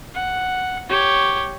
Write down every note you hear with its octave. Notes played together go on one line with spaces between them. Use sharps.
F#5
G4 C#5